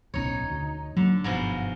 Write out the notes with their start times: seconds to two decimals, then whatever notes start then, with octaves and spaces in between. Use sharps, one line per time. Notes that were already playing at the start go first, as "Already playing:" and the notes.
0.14 D1 B1 C#4 D#4 C#5
0.50 D2
0.97 D3 F#3 G3 A#3
1.24 G1 G#2 B2 F3